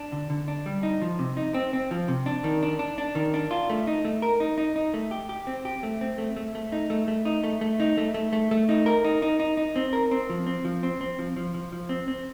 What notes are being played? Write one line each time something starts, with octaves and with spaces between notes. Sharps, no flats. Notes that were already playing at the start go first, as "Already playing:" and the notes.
Already playing: D4
D3
D3
D4
G3
D#4
F3
C3
D#4
C4
C4
F3
C3
D4
D#3
D4
D4
D4
D#3
D4
F4
A3
D#4
A3
A#4
D#4
D#4
D#4
A3
G4
G4
C4
G4
A3
C4
A3
A3
A3
D#4
A3
A3
D#4
A3
A3
D#4
A3
A3
A3
A3
D#4
A#4
D#4
D#4
D#4
D#4
C4
A#4
C4
F3
C4
F3
C4
C4
F3
F3
F3
F3
C4
C4